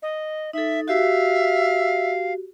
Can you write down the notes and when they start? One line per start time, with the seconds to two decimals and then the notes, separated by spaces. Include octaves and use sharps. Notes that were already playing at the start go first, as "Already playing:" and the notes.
0.02 D#5
0.53 D#4 A4 E5
0.88 F#4 G4 E5 F5